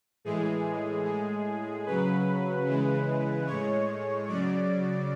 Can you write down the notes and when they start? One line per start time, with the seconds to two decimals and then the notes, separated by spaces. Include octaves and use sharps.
0.24 A2 E3 G#3 G#4
1.05 A2 G#3
1.86 C#3 F#3 B4
2.66 C#3 E3 G#3
3.46 A2 G#3 C#5
4.28 C#3 F#3 D5